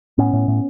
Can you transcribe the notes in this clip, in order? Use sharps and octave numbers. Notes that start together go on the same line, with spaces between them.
A2 B3 C#4
A2
A2